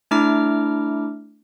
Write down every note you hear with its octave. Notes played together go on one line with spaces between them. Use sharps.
A3 D4 E4 A#5 D6 F6